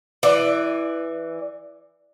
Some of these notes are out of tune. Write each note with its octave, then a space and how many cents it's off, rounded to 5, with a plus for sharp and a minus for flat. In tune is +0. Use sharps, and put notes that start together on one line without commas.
E3 +0 D5 +15